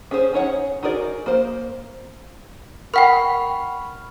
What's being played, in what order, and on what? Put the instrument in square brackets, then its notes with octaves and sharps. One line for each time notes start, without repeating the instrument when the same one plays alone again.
[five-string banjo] C#4 G#4 C5
C#4 D#4 C#5 F#5
D#4 F#4 G#4 A#4 D5
A#3 C5
[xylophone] A#4 F#5 G5 [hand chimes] B5 C#6 F6